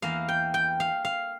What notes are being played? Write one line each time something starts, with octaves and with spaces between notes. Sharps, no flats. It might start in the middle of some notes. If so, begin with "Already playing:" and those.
E2 E3 A#3 F5
G5
G5
F5
F5